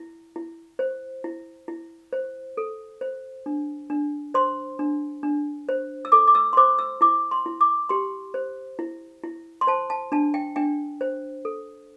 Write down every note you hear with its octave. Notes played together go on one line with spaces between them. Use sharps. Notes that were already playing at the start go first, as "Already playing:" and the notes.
Already playing: E4
E4
C5
E4
E4
C5
A4
C5
D4
D4
C5 C6
D4
D4
C5
E6
A4 D6
D6
E6
C6
C5 D6
E6
E4 D6
C6
E4
D6
G4 C6
C5
E4
E4
C6
C5 A5
A5
D4 A5
G5
D4 G5
C5
A4